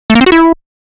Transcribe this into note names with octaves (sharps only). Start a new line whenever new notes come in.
A3
A#3
C4
F#4
E4